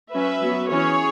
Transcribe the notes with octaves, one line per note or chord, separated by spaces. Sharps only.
F#3 C#4 B4 E5
F#3 B3
E3 C#4 G#4 C#5